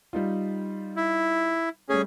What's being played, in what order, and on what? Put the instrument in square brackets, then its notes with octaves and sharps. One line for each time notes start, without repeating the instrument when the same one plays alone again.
[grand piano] G3 D#4 F4
[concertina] E4
[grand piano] G3 A3 [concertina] C#4 G#4